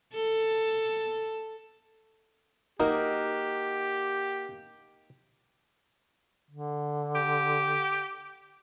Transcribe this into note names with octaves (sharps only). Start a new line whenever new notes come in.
A4
A#3 D#4 F#4 G4
D3
G4